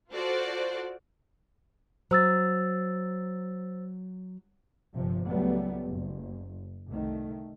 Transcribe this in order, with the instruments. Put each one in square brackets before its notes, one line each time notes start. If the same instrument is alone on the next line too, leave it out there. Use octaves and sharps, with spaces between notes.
[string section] F4 F#4 A4 C5 D5
[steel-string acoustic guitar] F#3 [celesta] C5 E6 A6
[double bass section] G1 C3 F3
C#2 F#3 G3 A3 B3
F#1
C2 D#3 A3